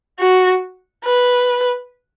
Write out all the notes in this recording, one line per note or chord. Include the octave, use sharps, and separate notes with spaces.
F#4
B4